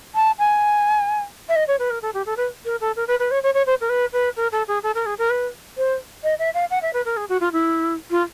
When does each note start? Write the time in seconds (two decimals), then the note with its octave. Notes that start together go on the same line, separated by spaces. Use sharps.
0.15 A5
0.39 G#5
1.49 E5
1.56 D#5
1.68 C#5
1.79 B4
1.90 A#4
2.02 A4
2.14 G4
2.26 A4
2.37 B4
2.65 A#4
2.81 A4
2.96 A#4
3.08 B4
3.19 B4
3.31 C#5
3.43 C#5
3.54 C#5
3.66 C5
3.81 A#4
3.89 B4
4.13 B4
4.37 A#4
4.52 A4
4.68 G#4
4.83 A4
4.95 A#4
5.06 G#4
5.18 A#4
5.30 B4
5.77 C5
6.23 D#5
6.39 E5
6.54 F5
6.71 F#5
6.82 E5
6.93 B4
7.05 A#4
7.17 G#4
7.29 F#4
7.41 F4
7.53 E4
8.11 F4